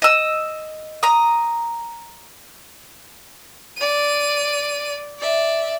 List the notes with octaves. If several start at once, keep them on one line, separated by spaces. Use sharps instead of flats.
D#5 E6
A#5 D#6
D5 D#7
D5 E5